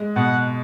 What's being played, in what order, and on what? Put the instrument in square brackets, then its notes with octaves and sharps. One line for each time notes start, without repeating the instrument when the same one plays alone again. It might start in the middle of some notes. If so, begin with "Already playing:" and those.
Already playing: [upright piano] G#3
[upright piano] B2 [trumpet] F#5